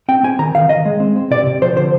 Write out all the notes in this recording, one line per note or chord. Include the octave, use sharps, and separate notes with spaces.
C4 G5
C4 G#5
D#3 A#5
D#3 F5
D#3 D#5
G#3
C4
C4
C3 D5
C3
F3 C5
D3 C5